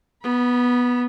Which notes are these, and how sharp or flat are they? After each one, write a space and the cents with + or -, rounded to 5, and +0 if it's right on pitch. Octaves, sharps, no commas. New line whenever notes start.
B3 -5 B5 -35